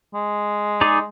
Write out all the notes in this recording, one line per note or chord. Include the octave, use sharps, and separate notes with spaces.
G#3
D#4 G#4 D5